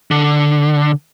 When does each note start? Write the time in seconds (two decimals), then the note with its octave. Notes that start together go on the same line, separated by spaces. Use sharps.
0.11 D3